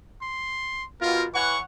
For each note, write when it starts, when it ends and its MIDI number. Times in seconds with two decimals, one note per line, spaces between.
0.22 0.85 84
1.01 1.25 47
1.01 1.25 65
1.01 1.25 70
1.35 1.56 52
1.35 1.56 73
1.35 1.56 78
1.35 1.60 85